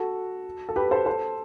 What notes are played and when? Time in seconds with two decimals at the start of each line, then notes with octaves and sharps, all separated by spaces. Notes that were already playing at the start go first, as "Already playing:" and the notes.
Already playing: F#4 A4
0.69 A4
0.76 G4 B4
0.91 A4 C5
1.06 A4 C5